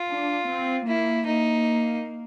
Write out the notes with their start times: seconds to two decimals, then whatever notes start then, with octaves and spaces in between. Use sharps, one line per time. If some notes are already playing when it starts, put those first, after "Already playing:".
Already playing: F4
0.08 D4
0.47 C4
0.87 A#3 E4
1.26 A#3 D#4